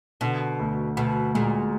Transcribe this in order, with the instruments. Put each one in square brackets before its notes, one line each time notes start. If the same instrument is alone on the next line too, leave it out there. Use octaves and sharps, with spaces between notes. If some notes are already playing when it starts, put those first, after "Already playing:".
[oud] B2 [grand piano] D3
[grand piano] D2
[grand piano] D2 [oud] B2
[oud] A#2 [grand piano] G#3